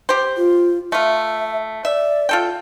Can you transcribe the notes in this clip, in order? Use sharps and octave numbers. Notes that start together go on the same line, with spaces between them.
G4 C5
F4
A3 F4 E5
D5 E5
F4 A4 G5